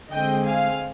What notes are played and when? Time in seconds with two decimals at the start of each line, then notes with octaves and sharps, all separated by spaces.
0.11 D3 G#3 C4 D#5 G5
0.45 F5 G#5